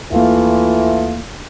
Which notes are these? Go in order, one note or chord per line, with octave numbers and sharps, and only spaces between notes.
D#2 E3 A3 A#3 F4